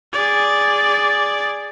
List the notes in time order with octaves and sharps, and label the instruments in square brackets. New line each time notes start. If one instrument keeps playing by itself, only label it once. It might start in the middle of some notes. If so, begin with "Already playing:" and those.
[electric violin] G#4 D5